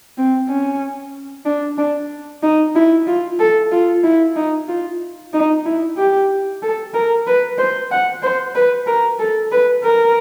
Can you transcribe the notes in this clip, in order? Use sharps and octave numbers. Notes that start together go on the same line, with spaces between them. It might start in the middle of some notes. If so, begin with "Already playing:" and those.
C4
C#4
D4
D4
D#4
E4
F4
A4
F4
E4
D#4
F4
D#4
E4
G4
A4
A#4
B4
C5
F#5
C5
B4
A#4
A4
B4
A#4